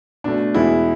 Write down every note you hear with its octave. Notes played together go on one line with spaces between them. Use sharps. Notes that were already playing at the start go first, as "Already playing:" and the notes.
B2 A3 D4
E2 B2 G#3 E4